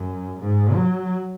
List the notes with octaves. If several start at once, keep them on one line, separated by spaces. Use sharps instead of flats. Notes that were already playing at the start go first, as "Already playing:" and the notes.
Already playing: F#2
G#2
F#3